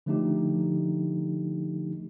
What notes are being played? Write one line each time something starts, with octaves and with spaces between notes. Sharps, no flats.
D3 F3 A3 D4 D#4 G4